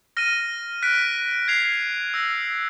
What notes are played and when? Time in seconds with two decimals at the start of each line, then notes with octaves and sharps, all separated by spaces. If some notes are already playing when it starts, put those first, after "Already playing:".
0.17 F6 A#6 D#7
0.82 F#6 B6 D7
1.48 G#6 C7 F7
2.14 E6 G6 A#6